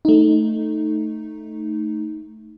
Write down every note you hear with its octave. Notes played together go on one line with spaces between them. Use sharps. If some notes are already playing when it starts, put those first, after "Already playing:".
A3 D#4